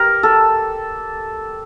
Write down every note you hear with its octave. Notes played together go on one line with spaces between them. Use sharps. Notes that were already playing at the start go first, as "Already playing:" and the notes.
Already playing: G4 A#4
A4